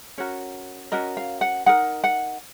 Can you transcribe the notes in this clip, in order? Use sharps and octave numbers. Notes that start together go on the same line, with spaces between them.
C#4 F#4 A#4 C#5
C#4 F#4 A#4 D#5
F5
F#5
D#4 A#4 F#5
F#5